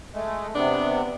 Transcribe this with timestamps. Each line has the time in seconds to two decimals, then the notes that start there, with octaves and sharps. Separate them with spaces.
0.14 G#3 A3
0.55 C3 B3 D4